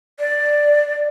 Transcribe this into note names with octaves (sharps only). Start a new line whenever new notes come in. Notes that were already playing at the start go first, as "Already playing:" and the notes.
D5